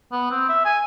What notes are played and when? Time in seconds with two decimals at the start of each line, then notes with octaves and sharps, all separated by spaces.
0.12 B3
0.31 C4
0.49 E5
0.65 G#5